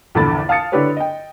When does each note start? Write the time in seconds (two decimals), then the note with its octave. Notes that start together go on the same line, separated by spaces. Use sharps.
0.15 A#1 E2 D3 A4 B5 A6
0.49 F5 A5 D#6 A6 C#7
0.72 D3 D4 E4 G4 B4 C#5
0.97 D#5 G5